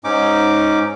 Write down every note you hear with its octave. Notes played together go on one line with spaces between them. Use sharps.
G#2 C#4 D#4 D6